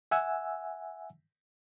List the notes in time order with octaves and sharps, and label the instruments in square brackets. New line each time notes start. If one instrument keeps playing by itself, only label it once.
[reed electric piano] E5 F#5 G#5 E6